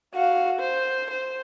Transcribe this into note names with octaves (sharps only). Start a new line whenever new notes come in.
F#4 F5
C5
C5